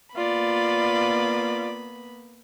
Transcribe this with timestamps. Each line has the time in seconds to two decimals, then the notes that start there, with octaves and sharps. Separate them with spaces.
0.16 A#3 B3 F4 D5 B5